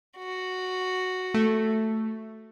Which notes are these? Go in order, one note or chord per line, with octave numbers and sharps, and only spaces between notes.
F#4
A3